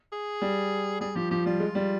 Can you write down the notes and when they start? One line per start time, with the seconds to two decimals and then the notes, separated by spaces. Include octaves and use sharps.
0.13 G#4
0.42 G3
1.01 G3 G#4
1.16 F3 G4
1.31 F3 G4
1.46 G3 F4
1.60 G#3
1.75 G3